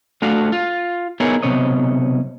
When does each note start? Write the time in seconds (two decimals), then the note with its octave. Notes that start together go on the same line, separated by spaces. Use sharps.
0.22 A3 D4 F4 F#4 F5
0.52 F4
1.20 B3 D#4 E4 G#4 A#4 C#5
1.42 B1 G#2 C3 B3 C#5 D#5